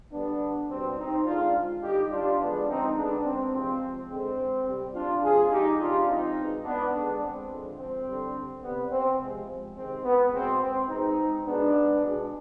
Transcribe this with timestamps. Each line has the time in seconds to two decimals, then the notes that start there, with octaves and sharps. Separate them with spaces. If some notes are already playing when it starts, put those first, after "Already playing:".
0.12 D3 G3 B3 D4
0.70 B2 G3 C4
0.97 C4 D#4
1.26 D3 G#3 D4 F4
1.83 D3 G3 D#4 G4
2.11 D4 F4
2.39 D3 F3 G#3 B3 D4
2.68 C4 D#4
2.95 D3 G#3 B3 D4
3.25 C4
3.52 C3 F3 G#3 C4
4.09 D3 G#3 C4
4.66 C3 G3
4.94 D4 F4
5.23 C3 F3 G#3 F4 G#4
5.51 D#4 G4
5.80 C3 F3 G#3 D4 F4
6.07 C4 D#4
6.37 B2 G#3
6.64 B3 D4
6.92 D3 G#3 B3 D4
7.21 C4
7.49 D3 F3 G#3
7.77 C4
8.06 D3 G3
8.63 C3 G3 B3
8.91 C4
9.20 C3 F3 G#3
9.76 C3 D#3 G#3 C4
10.04 B3
10.32 B2 G#3 C4
10.61 C4
10.89 B2 G#3 C4 D#4
11.46 B2 G#3 B3 D4
12.02 B2 G#3